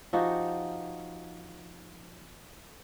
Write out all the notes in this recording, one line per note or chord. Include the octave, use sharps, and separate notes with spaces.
F3 D#4 F#4 G4